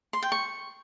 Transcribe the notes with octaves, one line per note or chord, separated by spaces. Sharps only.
C6
G5
C#6